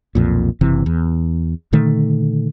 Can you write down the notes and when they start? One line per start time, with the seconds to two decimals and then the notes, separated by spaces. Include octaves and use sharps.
0.15 B1 F2 A#2
0.61 F#1 C3 E3
0.86 E2
1.73 A#2 D3 D#3 A3